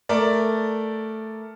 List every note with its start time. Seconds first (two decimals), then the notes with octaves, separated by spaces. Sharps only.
0.09 A3 A#4 D5